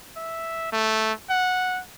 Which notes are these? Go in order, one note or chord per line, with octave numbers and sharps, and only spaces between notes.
E5
A3
F#5